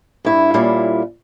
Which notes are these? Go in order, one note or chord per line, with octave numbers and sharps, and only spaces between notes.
G2 E4
A#2 G3 C#4 E4 F5